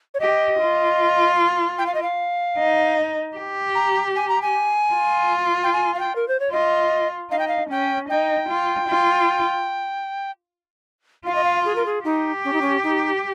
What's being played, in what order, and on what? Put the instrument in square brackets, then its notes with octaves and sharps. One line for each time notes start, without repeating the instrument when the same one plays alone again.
[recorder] C#5
[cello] G4 [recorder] D#5
[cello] F4
[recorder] G5
F5
D#5
F5
[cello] D#4
G4
[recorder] A#5
G#5
A#5
G#5
[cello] F4
[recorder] G5
G#5
F5
G5
A#4
C5
C#5
[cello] F4 [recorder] D#5
[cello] D#4 [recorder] F5
[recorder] G5
F5
[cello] C#4 [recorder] G5
[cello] D#4 [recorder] G5
[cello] F4
F4
[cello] F4 [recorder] F5
[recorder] D#5
F5
G#4
A#4
G#4
[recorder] D#4 [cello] G4
[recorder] C#4
D#4
C#4
D#4